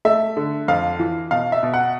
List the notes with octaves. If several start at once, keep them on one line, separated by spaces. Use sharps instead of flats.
A3 E5
D3
F2 F5
E3
B2 F5
E5
B2
F#5